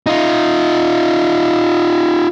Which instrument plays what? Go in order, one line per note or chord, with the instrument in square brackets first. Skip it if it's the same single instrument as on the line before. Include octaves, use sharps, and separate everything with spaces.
[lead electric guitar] D#4 F4